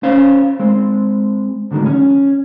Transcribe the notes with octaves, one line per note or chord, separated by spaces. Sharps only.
C#4 C5 C#5 F5
G#3 C4
A2 D3 D#3 F#3 G#3
C#4